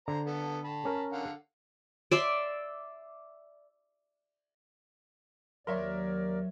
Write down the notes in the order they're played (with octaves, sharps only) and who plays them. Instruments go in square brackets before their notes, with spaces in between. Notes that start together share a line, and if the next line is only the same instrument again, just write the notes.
[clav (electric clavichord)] D3 [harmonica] C5 A#5
[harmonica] B3 A4
A5 B5
[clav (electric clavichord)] C#4 A#4
[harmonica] D3 F5 F#5
[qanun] D5 E5 C6
[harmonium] D#2 D5 [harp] F#3 [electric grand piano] A#4 [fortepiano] C#5 E5 C6